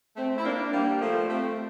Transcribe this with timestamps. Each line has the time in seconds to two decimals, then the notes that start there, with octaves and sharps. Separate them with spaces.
0.17 A3 C4
0.38 E4
0.45 A#3 D4
0.73 G3 A#3
1.01 F3 A3
1.29 A3 C4